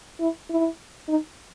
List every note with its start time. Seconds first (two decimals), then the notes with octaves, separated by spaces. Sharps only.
0.19 E4
0.49 E4
1.08 D#4